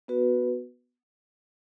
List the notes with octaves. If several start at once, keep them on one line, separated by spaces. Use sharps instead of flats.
B3 F#4 B4